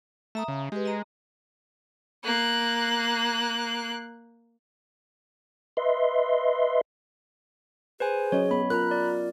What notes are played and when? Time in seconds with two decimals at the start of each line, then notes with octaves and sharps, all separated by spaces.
0.35 A3 E5 A#5 D#6
0.48 C#3
0.72 G#3 G4 B4
0.85 D#5 A#5
2.24 A#3 F#6
5.77 B4 D#5 E5 C6
8.00 G#4 B4 C5 G#5
8.32 F#3 C#4 C#5 D#5
8.51 B3 C#5 B5
8.70 F4 A#4 A#5 B5 F#6
8.91 D5